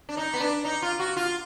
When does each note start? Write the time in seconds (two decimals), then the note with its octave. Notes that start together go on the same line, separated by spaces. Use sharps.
0.09 D4
0.17 D#4
0.33 B3
0.40 D4
0.65 D#4
0.82 F4
0.99 F#4
1.17 F4